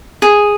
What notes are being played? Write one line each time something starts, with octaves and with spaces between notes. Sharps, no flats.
G#4